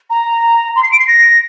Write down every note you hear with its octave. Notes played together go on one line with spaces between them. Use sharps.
A#5
C6
C7
D7
C7
A#6